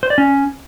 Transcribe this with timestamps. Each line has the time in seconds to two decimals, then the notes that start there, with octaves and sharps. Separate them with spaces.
0.03 C5
0.10 D5
0.18 C#4